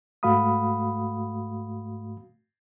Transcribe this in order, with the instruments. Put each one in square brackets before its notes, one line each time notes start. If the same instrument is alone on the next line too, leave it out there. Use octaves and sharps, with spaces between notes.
[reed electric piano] G#2 A3 F#4 F5 B5 D#6